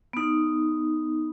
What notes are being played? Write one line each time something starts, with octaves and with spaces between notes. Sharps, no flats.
B3 D#4